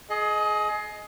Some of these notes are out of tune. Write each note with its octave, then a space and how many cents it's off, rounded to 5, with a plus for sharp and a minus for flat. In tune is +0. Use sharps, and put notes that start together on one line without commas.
G#4 +25 D#5 +0